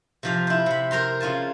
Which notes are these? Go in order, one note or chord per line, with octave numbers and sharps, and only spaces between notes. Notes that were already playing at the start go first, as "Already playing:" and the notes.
C3 F3 F5
E4 C5
C3 B5
A#4 C5 A#5 C6
C#3 F4 G#5 A5